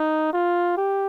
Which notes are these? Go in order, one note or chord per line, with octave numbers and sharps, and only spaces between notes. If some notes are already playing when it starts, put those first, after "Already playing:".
Already playing: D#4
F4
G4